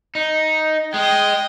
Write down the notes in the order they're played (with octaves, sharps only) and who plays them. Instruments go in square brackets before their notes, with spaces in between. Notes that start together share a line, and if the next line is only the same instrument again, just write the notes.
[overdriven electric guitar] D#4
[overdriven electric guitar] G#3 [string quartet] G5 D#6